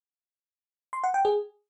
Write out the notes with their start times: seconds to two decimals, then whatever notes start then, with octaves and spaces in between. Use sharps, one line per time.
0.93 C6
1.04 F#5
1.14 G5
1.25 G#4